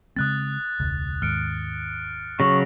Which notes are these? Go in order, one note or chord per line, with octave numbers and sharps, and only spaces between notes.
C#3 G#3 C4 D#6 F#6 A6
E1 C#2
D#2 G#2 F6 C#7 D7
C#3 F#3 C#6 A#6